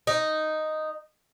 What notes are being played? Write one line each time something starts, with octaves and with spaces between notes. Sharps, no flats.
D#4